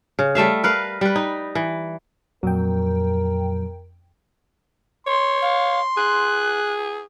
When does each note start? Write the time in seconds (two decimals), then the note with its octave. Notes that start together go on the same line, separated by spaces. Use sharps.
0.19 C#3
0.35 G3 A3 E5 F5
0.63 A#4 B4 F5
1.01 G3 B4
1.16 D#4
1.55 E3
2.43 F2 A#2 F#3 A#4 G5
5.07 C#5 C6
5.42 F5
5.97 G#4 F#6